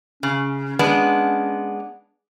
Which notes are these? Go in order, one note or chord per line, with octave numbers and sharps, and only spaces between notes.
C#3 C#4
G#3 B3 D4